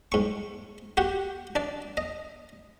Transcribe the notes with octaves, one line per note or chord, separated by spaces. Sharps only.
G#2 C#6
F#4 G4 F#5
D4 D5
D#5